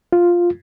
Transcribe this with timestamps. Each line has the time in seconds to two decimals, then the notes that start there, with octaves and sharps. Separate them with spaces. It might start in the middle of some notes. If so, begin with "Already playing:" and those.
0.13 F4